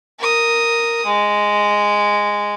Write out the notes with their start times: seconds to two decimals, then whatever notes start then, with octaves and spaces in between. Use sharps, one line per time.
0.19 A#4 D#6
1.05 G#3